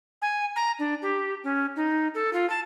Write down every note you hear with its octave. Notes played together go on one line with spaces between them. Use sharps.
G#5
A#5
D4
G4
C#4
D#4
A4
F4
A5